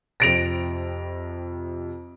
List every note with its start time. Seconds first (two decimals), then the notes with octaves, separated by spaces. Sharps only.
0.20 F2 C3 A#6 D7 F7